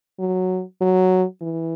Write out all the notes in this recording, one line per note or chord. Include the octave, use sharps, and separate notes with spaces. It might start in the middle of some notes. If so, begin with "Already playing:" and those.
F#3
F#3
E3